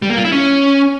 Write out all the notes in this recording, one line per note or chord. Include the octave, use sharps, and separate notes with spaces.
G3
A#3
F4
E4
C#4